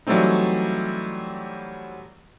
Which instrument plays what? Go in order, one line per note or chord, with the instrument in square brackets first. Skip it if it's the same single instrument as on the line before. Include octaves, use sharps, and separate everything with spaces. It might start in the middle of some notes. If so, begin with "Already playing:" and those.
[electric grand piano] E3 F#3 G3 A3 C4 D#4